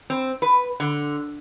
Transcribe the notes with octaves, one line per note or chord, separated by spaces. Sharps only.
C4
B4
D3